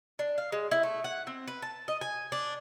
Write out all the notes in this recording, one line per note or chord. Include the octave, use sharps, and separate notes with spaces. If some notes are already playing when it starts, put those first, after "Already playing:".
D4
F5
G#3
E4
A3
F#5
C4
B4
A5
D#5
G#5
D4